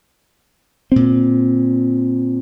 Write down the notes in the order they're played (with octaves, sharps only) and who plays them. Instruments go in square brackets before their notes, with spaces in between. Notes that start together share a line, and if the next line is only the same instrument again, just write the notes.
[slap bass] A#2 C4